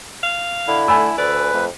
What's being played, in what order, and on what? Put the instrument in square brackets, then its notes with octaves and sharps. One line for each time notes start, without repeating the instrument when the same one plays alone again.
[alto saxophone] F5
[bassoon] D3 [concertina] E4
[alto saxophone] A3 [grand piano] G#5 B5 E6
[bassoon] D2 [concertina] B4 [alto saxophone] D5
[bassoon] F2 [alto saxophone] A3